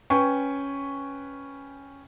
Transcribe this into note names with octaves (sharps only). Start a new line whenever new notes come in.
C#4 B4 G5 G#5 C#6